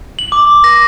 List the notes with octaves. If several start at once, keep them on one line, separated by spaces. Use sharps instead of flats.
F#7
D6
A#6